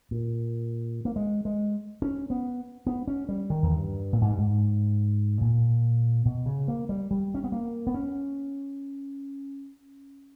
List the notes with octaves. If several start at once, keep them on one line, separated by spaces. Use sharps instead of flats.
A#2
A#3
G#3
G#3
C#4
B3
B3
C#4
G3
D#3
E2
G2
A#2
G#2
G2
G#2
A#2
B2
C#3
A#3
G3
G3
C#4
B3
A#3
B3
C#4